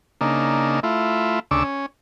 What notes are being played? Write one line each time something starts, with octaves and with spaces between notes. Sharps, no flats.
C#3 A#3 D4 D#4
A3 E4 F4
D2 C#3 D4 C#6 D6 E6
C#4